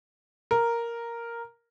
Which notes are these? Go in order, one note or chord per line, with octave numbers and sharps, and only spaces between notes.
A#4